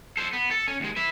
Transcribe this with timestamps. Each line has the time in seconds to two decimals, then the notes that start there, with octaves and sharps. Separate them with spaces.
0.17 A4 C5
0.33 B3
0.51 A4
0.68 C#4
0.80 D#2 G#3
0.96 B4 E5